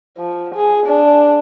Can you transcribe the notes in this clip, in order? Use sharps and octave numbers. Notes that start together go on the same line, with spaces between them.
F3
G#4
D4